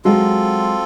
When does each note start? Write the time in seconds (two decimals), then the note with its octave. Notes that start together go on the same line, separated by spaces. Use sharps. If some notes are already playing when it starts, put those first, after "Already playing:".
0.05 F#3 G#3 C4 F4 A4